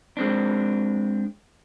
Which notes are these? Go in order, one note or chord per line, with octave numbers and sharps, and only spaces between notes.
G#3 C4 D4